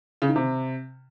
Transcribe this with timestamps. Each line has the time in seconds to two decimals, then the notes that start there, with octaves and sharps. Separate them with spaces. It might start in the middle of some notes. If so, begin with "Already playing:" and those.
0.22 C#3
0.29 D#3
0.36 C3